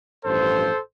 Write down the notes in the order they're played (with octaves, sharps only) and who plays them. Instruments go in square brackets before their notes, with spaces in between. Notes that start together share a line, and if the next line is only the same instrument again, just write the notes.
[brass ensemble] A1 G2 F3 A4 C5